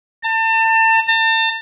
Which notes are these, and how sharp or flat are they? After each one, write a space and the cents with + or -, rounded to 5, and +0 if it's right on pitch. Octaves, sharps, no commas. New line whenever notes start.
A5 +35
A5 +40